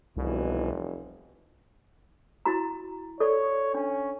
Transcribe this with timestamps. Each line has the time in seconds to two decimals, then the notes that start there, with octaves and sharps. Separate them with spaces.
0.17 F1 C2 B2 E3
2.46 E4 F#4 A#5
3.20 A4 C#5 D5
3.75 C#4 D4